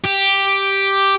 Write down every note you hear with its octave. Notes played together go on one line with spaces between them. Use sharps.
G4